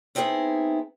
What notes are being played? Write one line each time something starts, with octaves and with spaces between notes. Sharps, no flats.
B3 C4 D#4 E4 F#4 G#4